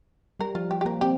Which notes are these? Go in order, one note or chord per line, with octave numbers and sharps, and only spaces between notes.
G3 A#4
F3 F4
G3 G4
G4
A#3 A#4
C4 G4